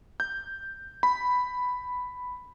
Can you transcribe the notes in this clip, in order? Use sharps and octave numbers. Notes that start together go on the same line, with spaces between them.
G6
B5